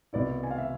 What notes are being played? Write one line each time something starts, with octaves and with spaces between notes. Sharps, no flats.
C2 B2 B3 E4 D5
G#5
F5
E5